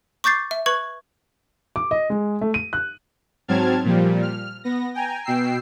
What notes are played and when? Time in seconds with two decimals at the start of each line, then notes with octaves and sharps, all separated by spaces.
0.24 C#6 D6 G6 A6 C7
0.51 E5
0.66 B4 C#6 G#6 F#7
1.76 D6
1.91 D#5
2.10 G#3
2.41 A3
2.54 D#7
2.73 F#6
3.48 G#2 F#3 C4 A5 F6 G#6
3.84 A#2 F3 G3
4.22 F6
4.64 B3 A#6
4.94 G5 G#5 A#5
5.24 B2 G5 E6 C7